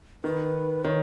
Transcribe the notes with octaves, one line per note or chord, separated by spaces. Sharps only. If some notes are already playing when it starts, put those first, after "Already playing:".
D#3 B4
D#3 C#5